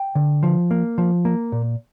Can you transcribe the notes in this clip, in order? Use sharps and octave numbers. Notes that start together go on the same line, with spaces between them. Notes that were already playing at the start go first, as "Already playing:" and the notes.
Already playing: G5
D3
F3
A#3
F3
A#3
A#2